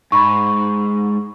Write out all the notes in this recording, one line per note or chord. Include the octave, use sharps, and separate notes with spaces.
G#2 B5 C#6